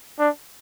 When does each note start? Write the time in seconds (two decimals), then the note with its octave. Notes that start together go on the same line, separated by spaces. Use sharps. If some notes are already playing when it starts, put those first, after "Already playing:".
0.19 D4